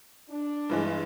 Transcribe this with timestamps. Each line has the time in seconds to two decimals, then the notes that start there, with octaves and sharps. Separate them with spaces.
0.29 D4
0.69 G2 E3 G#3